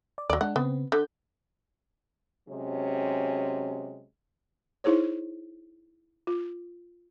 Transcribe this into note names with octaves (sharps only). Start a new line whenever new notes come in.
D5
D#2 F#3 D5
G#3 D4 F#5
C#3 B3 C4
D3 G6
C3 F#3 G#3 C#4
D#4 E4 G#4 C5 C#5
F4